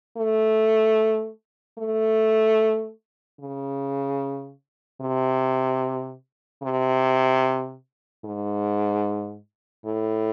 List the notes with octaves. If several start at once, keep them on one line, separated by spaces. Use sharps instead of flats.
A3
A3
C#3
C3
C3
G#2
A2